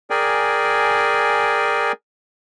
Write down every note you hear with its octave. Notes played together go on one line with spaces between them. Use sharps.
G#4 A#4 D5 G5 G#5